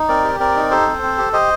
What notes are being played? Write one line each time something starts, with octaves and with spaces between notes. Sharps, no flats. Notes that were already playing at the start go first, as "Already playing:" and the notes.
Already playing: D#4
C4 A#4 D5
G4
C4 A#4 D5
D#4
G4 A4 C5
C4
C4
G4
G4 C5 D#5